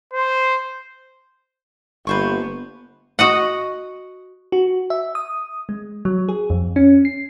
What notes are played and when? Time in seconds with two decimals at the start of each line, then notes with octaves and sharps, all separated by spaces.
0.13 C5
2.07 G1 A#3 B3 B4 C5 C#6
3.19 F#4 D#5 F#5
4.52 F#4
4.90 E5
5.15 D#6
5.69 G#3
6.05 F#3
6.29 G#4
6.50 F2
6.76 C#4
7.05 C7